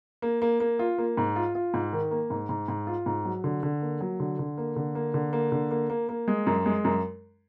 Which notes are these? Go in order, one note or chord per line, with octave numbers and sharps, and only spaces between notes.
A#3
A#3
A#3
F4
A#3
G#2
F4
F4
G#2
D#3
A#3
G#2
G#2
G#2
F4
G#2
F#3
D3
D3
A#3
F#3
D3
D3
A#3
D3
A#3
D3
A#3
D3
A#3
A#3
A#3
G#3
F#2
G#3
F#2